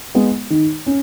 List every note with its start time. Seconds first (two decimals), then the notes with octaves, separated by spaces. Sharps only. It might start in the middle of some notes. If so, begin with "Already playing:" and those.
0.15 G#3 B3
0.50 D#3
0.86 C#4